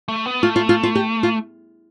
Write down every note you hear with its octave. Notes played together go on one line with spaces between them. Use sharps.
A3
B3
A3 F4
F4
F4
F4
G4
F4